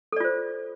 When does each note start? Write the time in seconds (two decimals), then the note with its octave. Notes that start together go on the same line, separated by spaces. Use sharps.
0.12 A4
0.16 D5
0.20 F4
0.24 C5